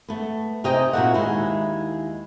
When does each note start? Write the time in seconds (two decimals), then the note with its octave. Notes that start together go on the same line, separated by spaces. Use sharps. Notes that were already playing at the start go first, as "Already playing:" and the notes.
0.08 A3 B3
0.64 C3 D#4 G4 D#5 G5 G#5
0.93 A#2 D#4 F#4 A#4 E5 F#5
1.14 D#2 G#3 E4